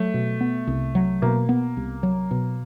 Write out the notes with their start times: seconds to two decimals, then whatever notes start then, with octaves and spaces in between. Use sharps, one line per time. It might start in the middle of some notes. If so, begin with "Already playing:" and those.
Already playing: F#3 A3
0.14 B2
0.41 B3
0.67 C2
0.95 F#3
1.22 B2 A#3
1.49 B3
1.77 C2
2.03 F#3
2.31 B2